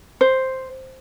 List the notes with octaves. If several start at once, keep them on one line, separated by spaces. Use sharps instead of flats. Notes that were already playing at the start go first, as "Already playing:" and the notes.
C5